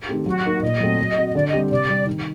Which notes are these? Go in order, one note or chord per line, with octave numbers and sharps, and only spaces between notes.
D#3 A3 C4 G4
F#3 F#4
A#3 D#4
A#2 D#5
F#3 A3 C4
F#3
C4 F#4
D#5
D3 D5
D#5
G3 C4 G4
C3 D5
G3 C4
D#3